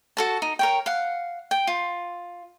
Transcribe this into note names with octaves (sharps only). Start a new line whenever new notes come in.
F#4 A4 A5
D#4
A#4 C#5 G5
F5 F#5
G5
F4